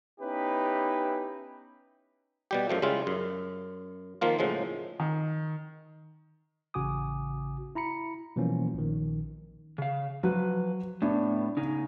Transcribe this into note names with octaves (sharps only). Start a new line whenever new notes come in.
B3 C#4 D#4 E4 G4 B4
B2 G3 G4
F#2 F3 A3
C#3 G3 G#3 E4 F4
F#2
D#3 F3 A#3 F4
A2 C#3 F3 F#3 G#3
D#3
A1 C#3 F#4 G#5 D6 D#6
E4 A#5 B5 C#7
B2 E3 F3 G3 A#3 C#4
A#1 D#3
C#3 F5
F3 F#3 B4
A2 B3 D4
C#3 C#4 D#4